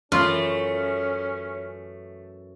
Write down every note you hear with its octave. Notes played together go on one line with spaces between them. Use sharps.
F#2 E3 A3 C#4 F4